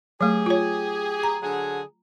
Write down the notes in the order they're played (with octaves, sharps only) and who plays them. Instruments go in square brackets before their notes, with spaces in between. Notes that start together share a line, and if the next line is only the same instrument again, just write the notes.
[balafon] F#3 A3 [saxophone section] G4 G#4
[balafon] F4 C#5
A#5
[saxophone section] D3 F#3 G#4